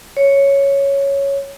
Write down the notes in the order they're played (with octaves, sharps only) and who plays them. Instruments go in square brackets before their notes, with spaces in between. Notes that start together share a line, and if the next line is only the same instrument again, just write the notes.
[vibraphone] C#5